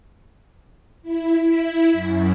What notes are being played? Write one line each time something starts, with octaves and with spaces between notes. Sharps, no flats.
E4
E4
F#2